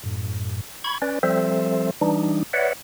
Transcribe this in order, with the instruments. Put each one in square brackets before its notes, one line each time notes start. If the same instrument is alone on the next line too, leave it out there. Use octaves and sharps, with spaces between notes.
[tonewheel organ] F#2 A2
B5 C#6 G#6
C#4 B4 D5
F3 G3 C4 A4 C5 E5
E3 G3 D4 D#4
B4 C#5 D5 E5 F#5